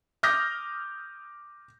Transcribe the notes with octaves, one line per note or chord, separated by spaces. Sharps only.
D6 D#6 F6 G6 A#6